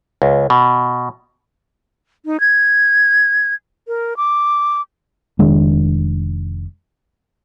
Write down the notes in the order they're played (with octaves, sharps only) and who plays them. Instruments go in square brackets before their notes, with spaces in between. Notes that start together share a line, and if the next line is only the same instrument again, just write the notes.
[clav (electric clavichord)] C#2
B2
[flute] D#4
G#6
A#4
D6
[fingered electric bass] F1 D#3 G#3 D4